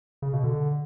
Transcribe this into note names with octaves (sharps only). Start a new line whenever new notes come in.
C#3
B2
D3